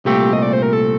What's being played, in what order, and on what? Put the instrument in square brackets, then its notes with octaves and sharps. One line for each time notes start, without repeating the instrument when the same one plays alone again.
[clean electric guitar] C2 A#2 A3 C4 [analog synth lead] G4
[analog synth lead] D#5
D5
C5
A#4
A4